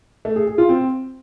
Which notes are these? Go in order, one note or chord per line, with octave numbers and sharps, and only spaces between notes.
A3
G#4
G#4
F4
C4